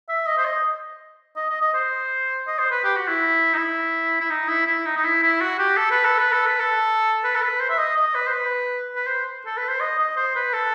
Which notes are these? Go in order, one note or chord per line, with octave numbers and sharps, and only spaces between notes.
E5
D#5
C5
D#5
D#5
D#5
D#5
C5
D#5
C5
B4
G4
F#4
E4
D#4
E4
E4
D#4
E4
E4
D#4
D#4
E4
E4
F#4
G4
A4
B4
A4
B4
A4
B4
A4
B4
A4
B4
C5
E5
D#5
D#5
B4
C5
B4
B4
C5
A4
B4
C5
D#5
D#5
C5
B4
A4